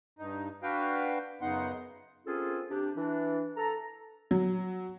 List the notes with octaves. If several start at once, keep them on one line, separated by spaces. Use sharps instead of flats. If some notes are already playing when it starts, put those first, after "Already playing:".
G2 D#4
D4 F#4 B4 F5 G5
F#2 C#3 B3 D#4 F#5 C6
A#3 C4 C#4 F4 G#4 A4
C3 D4 G4
E3 D4
A4 A#5
F#3